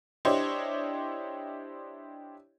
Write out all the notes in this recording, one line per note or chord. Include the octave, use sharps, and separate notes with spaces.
D4 E4 G4 C5 C#5 D#5